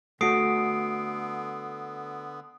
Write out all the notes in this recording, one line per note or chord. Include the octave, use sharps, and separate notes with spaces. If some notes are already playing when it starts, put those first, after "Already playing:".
D3 A3 B3 F#4 D#6 C7 D7